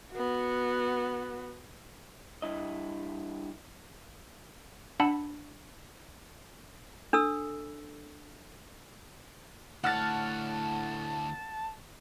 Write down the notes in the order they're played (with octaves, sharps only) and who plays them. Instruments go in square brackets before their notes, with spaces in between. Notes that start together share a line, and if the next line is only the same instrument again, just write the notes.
[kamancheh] B3 F#4
[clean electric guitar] G2 E4 D#5
[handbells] D4 F#5 A5 B5 E6
[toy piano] D4 A4 E6
[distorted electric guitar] D2 C#5 [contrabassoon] A2 [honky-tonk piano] F#5 F6 A6 [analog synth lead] A5